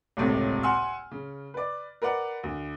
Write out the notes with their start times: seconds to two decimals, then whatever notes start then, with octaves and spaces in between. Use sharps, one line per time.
0.17 D#1 G#1 C#2 A2 C3
0.63 F#5 G#5 C6 E6 F6
1.11 C#3
1.54 B4 D5
2.02 A#4 B4 D5 F#5
2.43 D2